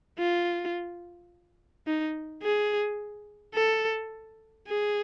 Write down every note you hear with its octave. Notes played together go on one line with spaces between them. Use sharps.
F4
D#4
G#4
A4
G#4